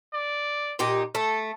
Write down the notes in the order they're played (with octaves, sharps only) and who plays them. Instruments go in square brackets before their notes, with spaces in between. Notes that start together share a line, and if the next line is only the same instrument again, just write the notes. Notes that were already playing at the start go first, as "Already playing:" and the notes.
[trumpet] D5
[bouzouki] A#2 D#4 G4
[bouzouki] A3 [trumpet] A4